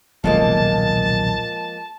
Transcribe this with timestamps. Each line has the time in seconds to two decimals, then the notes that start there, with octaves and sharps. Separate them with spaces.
0.24 D#1 B1 C3 F3 G#3 A#3 A5